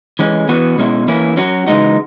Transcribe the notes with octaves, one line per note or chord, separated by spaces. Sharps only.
E3 G#3 C#4
E3 B3 F#4
B2 G#3 C#4 E4
E3 A#3 C#4 E4
F#3 C#4 F#4
C#3 E3 G#3 D#4 F#4